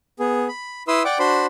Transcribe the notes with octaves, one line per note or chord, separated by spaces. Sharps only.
B3 G#4
B5
E4 B4 C6 D#6 E6
D5 F#5 G5 D6
D4 F#4 C5 B5 C6